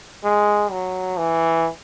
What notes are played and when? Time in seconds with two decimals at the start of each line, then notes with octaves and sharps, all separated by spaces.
0.24 G#3
0.71 F#3
1.18 E3